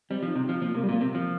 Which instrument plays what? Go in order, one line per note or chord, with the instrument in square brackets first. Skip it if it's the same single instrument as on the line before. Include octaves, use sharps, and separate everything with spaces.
[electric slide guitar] G3 [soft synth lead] C4
[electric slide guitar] F3
[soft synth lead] D#4
[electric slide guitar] C3
[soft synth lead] C4
[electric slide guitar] F3
[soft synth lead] C4
[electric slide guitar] F3 [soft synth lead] A#3
[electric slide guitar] C3 [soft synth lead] A#3
[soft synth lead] G3
[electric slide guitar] A#2 [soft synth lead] A#3
[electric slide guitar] C3 [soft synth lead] C4
[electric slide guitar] F3 [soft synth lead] A#3